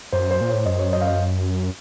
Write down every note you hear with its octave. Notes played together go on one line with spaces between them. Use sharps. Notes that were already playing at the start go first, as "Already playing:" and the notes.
F#2 C5
C5
A#2
C#5
A2
F#2 D#5
C#5
D#5
F5
D#5